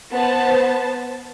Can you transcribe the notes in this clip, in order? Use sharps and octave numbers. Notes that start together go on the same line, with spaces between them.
B3 C5 A5